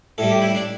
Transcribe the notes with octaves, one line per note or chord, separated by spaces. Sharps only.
A2 G3 A4
G4
E4
D4